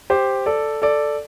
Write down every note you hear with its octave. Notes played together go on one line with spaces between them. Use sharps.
G4 C5
A4 D5
A4 D5